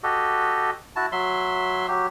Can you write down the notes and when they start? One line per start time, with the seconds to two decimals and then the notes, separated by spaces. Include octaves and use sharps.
0.03 F#4 G4 A4 D#5
0.96 E4 F#4 A5
1.12 F#3 E5 C6
1.88 F#3 G4